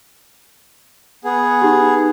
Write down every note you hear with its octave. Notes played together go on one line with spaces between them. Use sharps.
B3 G#4
D#4 G4